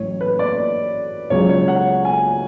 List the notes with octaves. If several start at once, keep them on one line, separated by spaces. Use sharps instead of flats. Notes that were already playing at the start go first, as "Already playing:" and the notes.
Already playing: A1 A2 F#3 C#5
B4
D5
C#2 C#3 F#3 C#5
C#5
F#5
G#5